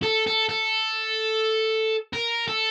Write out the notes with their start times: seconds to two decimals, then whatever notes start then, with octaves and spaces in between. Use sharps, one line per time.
0.03 A4
0.27 A4
0.49 A4
2.13 A#4
2.48 A4